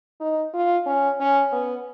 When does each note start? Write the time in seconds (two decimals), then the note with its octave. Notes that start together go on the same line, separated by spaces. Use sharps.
0.20 D#4
0.54 F4
0.86 C#4
1.20 C#4
1.52 B3